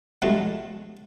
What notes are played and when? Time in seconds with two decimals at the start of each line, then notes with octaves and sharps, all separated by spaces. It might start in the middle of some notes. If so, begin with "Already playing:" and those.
0.22 G2 B2 F3 F#3 G#3 A3